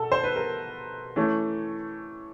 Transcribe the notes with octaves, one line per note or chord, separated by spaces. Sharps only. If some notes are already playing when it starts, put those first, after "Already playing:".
Already playing: B2 A4
C5
B4
A#4
E3 A3 C#4